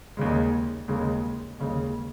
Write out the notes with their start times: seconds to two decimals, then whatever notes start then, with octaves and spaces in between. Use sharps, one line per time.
0.17 D#2 C#3 G#3
0.88 D#2 C#3 G#3
1.59 D#2 C#3 G#3